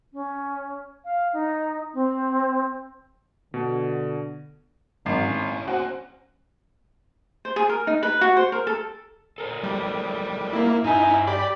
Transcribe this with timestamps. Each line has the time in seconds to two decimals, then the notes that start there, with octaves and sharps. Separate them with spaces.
0.13 C#4
1.04 F5
1.33 D#4
1.94 C4
3.54 B2 D3
5.06 G#1 F#3
5.24 A2 C#4
5.68 C4 C#4 F#4
7.45 C5
7.56 G#4
7.69 A#4
7.87 D#4
8.03 B4
8.21 F#4
8.37 C5
8.52 A#4
8.67 A4
9.38 A4 A#4 C5
9.63 G3
10.53 A#3 E4
10.84 G2 D#4 E4 G#5
11.27 G4 D5 B5